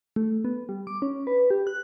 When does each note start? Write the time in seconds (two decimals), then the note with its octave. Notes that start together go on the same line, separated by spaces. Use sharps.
0.16 A3
0.44 B3
0.69 G3
0.87 D6
1.02 C#4
1.27 B4
1.50 G4
1.67 F#6